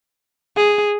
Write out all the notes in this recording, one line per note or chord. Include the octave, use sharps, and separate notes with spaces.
G#4